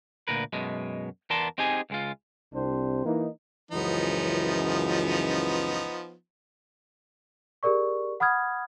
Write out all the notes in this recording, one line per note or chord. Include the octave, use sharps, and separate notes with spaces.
D2 A#2 A#4 B4
F#2 B2 G#3
E2 B3 A#4 D5 A5 C6
C4 D#4 G4 G#4 G#5
C#2 G#3 F4
C2 C3 C4 D4 C5
E3 A#3 D#4
C#2 F#2 E3 F3 B3 D#4
G4 G#4 A#4 D5 C#6
F#5 B5 D#6 F6 G#6